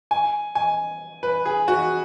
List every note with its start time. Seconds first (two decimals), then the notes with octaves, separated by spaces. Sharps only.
0.11 G#5
0.55 G#5
1.23 B4
1.45 G#4
1.68 F#4